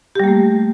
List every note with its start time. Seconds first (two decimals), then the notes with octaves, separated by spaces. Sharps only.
0.15 G4
0.20 G3
0.24 A#3
0.28 A3